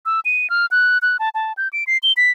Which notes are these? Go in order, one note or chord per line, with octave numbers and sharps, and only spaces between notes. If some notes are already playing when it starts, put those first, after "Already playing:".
E6
D#7
F6
F#6
F#6
A5
A5
G6
D7
C7
G7
B6